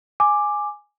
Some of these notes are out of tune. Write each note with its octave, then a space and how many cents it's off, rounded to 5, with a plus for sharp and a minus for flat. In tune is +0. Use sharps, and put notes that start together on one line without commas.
G#5 +0 D6 +10